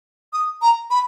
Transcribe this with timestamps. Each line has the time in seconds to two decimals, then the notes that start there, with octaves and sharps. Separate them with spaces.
0.33 D#6
0.62 A#5
0.90 B5